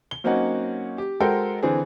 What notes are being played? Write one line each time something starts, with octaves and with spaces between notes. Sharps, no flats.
G7
F#3 A#3 C4 C#4 D#4 F#5
G4
G#3 F#4 A4 A#4 C5 G5
D3 E3 C4 G#4